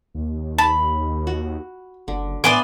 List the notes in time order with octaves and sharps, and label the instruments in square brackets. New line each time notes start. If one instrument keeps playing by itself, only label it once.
[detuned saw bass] D#2
[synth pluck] A5 [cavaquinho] B5
[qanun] F#4
[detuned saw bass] F#1 [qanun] D3
[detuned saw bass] A2 [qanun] B3 B4 E5 [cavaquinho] D5 G#5 C6 [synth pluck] D7